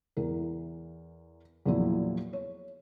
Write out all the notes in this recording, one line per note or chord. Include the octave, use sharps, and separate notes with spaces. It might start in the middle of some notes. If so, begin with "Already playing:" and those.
E2 E3 A#4
E2 A#2 F3 F#3 E4
C#5